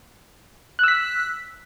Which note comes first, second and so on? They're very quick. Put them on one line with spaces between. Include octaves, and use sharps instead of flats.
F#6 E6 B6